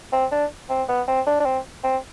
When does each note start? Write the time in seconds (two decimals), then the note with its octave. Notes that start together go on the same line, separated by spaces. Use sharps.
0.13 C4
0.32 D4
0.70 C4
0.89 B3
1.08 C4
1.27 D4
1.40 D4
1.45 C4
1.84 C4